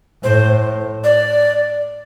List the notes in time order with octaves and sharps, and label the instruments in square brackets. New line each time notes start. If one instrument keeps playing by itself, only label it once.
[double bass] A2 [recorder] C5
[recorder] D5